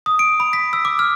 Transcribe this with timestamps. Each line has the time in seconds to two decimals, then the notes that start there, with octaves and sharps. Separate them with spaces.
0.06 D#6
0.19 D7
0.40 B5
0.53 B6
0.73 E6
0.85 D6
0.99 F6